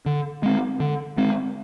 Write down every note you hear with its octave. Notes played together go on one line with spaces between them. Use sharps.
D3
G#3 C4
D3
G#3 C4